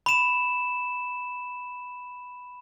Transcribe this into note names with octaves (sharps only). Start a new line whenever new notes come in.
B5 E7